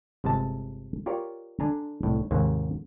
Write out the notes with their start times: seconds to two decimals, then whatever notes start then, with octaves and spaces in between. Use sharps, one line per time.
0.24 G1 C3 G#3 A5
1.06 F4 G4 A#4 C#5 D5
1.60 D3 D4 G#5 A#5
2.03 C2 A2
2.31 D#2 G#2 C3 A#3